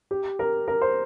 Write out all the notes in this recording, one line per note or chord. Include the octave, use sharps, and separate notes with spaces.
G4
A#4
A#4
C5